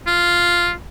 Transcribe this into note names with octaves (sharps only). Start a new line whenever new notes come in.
F4